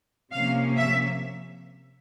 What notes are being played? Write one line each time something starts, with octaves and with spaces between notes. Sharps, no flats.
C3 F3 A#3 C#4 F5
E5